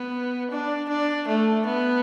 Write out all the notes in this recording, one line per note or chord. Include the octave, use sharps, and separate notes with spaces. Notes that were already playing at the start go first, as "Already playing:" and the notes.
Already playing: B3
D4
D4
A3
B3